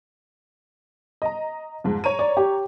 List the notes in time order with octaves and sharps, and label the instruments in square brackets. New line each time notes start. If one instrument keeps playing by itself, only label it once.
[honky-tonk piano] D#5 A#5
F2 G#2
C#5 A#5 D#7
[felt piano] D5
G4